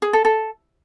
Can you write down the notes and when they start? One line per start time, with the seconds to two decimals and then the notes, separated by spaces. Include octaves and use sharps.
0.02 G#4
0.13 A4
0.25 A4